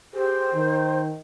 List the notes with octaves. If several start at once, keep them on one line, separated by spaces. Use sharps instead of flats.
G4 G#4 C5
D#3